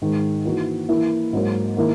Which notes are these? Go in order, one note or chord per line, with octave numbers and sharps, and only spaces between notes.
G#2 D#3 G#3
E3 A#3 D#4 F#4
E3 A#3 E4
G#2 F#3 A#3
D#3 A#3 E4